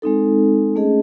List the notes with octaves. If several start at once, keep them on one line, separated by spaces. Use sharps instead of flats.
G#3 C4 D#4 A4
A3 C#4 G#4 D#5